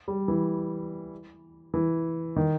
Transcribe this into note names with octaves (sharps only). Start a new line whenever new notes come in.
G3
E3
E3
D#3